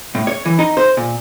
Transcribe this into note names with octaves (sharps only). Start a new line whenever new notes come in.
A2
C#5
E3
D#4
C5
A#2